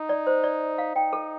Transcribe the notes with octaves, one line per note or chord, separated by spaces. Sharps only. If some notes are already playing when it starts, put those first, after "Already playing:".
Already playing: D#4
D5
C5
D5
F5
D#4 G5
A4